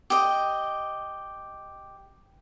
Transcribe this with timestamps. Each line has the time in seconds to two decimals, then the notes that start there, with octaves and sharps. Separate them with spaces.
0.10 G4 D#5